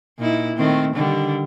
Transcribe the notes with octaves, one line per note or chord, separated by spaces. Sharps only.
A#2 D#4 E4
D#3 A3 C4
D3 D#3 G3